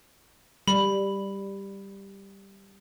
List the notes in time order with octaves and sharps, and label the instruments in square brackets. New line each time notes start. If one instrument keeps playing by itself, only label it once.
[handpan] G3 [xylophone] B5